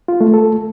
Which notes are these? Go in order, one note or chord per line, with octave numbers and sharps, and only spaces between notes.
F4
A3
A4